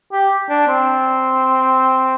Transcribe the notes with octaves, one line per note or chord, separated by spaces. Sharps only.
G4
D4
C4